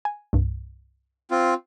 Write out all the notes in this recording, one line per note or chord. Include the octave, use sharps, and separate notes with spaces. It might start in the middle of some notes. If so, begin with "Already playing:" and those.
G#5
C2 G2
C4 F4